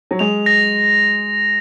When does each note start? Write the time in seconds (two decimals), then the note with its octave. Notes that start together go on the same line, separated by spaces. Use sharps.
0.11 F#3
0.19 G#3 F7
0.46 A#6